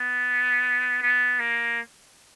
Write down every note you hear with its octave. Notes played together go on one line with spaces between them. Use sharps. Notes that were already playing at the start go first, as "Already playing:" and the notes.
Already playing: B3
B3
A#3